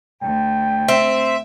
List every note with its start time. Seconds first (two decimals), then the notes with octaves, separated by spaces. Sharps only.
0.23 D2 G5
0.88 C4 E5